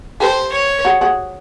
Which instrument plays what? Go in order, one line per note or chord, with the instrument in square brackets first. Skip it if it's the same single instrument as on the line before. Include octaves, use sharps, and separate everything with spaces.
[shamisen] G4 A4 [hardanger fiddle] C5
[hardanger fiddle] C#5
[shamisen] F#4 G#4
F#4 G#4